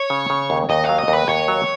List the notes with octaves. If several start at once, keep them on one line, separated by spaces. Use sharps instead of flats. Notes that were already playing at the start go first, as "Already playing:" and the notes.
Already playing: C#5
C#3
C#3
D#2
D#2 D#5
F#3 F5
D#5
D#2 B4
D#2 C#5
F#3